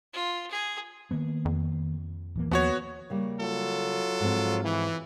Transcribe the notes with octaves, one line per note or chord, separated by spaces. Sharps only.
F4
G#4
D#3 A#3 B3
F2
D1 E3 A#3
D#2 F3 A#3 B3 F#4 C#5
C#3 G3 A#3
F#3 F4 A4
G#2 F3 C4
E3